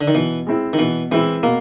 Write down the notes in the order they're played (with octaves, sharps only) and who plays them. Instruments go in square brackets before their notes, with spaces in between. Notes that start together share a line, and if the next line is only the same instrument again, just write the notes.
[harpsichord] D3
D#3
[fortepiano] B2 [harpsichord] E3
[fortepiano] G#3 C4 E4
[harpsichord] D#3
[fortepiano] B2 [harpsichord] E3
[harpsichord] E3 [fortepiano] G#3 C4 E4
[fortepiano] B2 [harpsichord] A#3